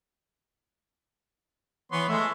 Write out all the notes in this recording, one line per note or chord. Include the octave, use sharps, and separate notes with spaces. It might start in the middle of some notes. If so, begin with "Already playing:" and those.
E3 B3 C#5 C6
G#3 A3 E5